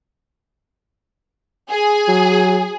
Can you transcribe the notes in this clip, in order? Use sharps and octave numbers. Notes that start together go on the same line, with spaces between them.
G#4
F#3